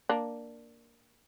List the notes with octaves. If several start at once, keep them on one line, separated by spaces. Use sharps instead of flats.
A#3 D4